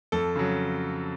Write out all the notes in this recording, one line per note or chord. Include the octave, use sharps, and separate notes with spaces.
F2 A4
C#3 F#3